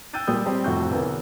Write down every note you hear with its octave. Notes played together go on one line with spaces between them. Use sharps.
G5 E6 F#6 G6 A6 D#7
A#2 G3 D#6 G6
G3 C4 G4 C5
F1 F2 A2 F#4 C#6 G6
B1 E2 D3 B3 A#4